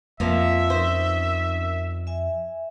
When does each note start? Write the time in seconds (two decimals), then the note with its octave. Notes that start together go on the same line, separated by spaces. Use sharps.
0.20 F2 F3 A#3 A#4 E5 F5
0.70 C#4 D#4 A#4 C5
2.07 E5 G#5